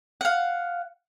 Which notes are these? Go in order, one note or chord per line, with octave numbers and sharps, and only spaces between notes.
F5 F#5